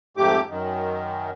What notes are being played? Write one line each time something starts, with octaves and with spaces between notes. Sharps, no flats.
F2 G#2 A3 G4 D6
F#2 D#3